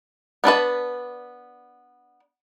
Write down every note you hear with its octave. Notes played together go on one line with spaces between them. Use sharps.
B3 D4 B4 A5